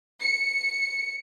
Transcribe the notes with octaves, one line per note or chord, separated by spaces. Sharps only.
C#7